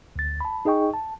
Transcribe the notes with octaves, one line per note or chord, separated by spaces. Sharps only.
D2 A6
A5 B5
D#4 G#4 D#5 G5 C#6
A5